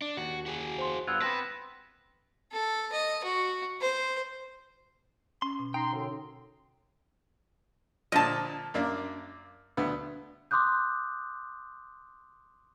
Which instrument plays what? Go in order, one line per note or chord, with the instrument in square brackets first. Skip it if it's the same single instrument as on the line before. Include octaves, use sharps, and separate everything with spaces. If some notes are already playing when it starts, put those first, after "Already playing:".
[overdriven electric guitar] D4
[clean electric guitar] D#2 [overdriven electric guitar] F#4
[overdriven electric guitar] F#4 G#4
[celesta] C5 C6
[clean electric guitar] G2 B3 F4 [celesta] E6 F#6 G#6
[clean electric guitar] B3 C4 D4 [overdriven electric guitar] B4 [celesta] A#6 E7
[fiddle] A4
D#5
F#4
C5
[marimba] C#4 [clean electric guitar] C6
[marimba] B2
[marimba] D#4 [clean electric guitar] G5 [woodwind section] A#5 C6
[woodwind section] F#2 D3
[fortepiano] A#2 D3 F3 [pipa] D#5 A5
[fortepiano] F#2 A#3 D4
D2 B3
[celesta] C6 D6 D#6 F#6 G6